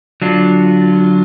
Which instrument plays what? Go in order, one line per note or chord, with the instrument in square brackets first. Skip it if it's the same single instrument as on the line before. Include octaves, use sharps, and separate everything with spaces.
[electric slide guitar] D3 F#3 D4 F4